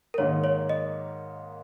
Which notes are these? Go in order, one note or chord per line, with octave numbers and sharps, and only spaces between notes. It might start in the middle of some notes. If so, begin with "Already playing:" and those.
A#4
G#2 D#3 A#3 C#5
C#5
D#5